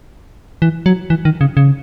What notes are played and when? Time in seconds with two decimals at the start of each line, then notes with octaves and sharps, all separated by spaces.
0.62 E3
0.86 F#3
1.10 E3
1.25 D#3
1.41 C#3
1.57 C#3